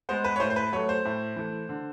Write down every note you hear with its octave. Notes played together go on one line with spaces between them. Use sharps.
G#3 B3 C5
B4
C#5
A2 C5
C5
B4
F#3 A3 C#5
C5
A2
E3 A3
D3